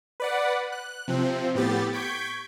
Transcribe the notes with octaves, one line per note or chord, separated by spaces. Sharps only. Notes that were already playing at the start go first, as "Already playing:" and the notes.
B4 D5 F#5
F#6
C3 F3 C4
A2 B3 G4 A6
C#6 G6 G#6 B6 D7